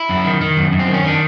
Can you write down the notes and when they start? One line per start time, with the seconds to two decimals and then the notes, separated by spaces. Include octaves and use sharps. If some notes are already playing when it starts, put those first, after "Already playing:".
Already playing: E4
0.09 F#2
0.25 D#3
0.41 D#3
0.57 F#2
0.72 F#2
0.79 C4
0.88 D#3
0.94 C#4
1.04 D#3 D4